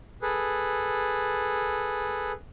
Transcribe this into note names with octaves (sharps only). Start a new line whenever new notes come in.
G#4 A4 B4